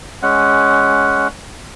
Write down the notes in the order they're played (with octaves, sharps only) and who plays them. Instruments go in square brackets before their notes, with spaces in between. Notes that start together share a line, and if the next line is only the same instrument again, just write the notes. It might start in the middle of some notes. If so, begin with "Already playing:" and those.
[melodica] G#3 C#4 F#5